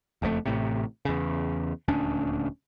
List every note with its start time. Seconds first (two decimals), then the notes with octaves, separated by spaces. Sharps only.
0.22 F#1 F2 G#2 A3
0.46 A1 A2 C3
1.05 E2 C#3
1.88 D#1 D2 C#4 D4